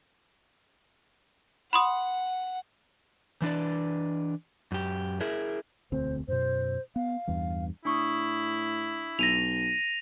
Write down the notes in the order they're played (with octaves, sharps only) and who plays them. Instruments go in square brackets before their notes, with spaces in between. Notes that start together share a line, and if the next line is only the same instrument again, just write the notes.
[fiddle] F#5 [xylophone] B5 C6 D#6
[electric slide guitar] E3 D4 B4 D5
F#2 G4
E4 G#4 A#4 E5
[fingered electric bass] E1 D2 C4 [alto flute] C5
[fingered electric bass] F#2 B2 [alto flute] C5
[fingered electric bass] B3 [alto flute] F5
[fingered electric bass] E2 G2 E3
[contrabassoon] A2 [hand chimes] D4 C#6 D#6 [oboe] E4
[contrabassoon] B1 [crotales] A#6 D#7 F7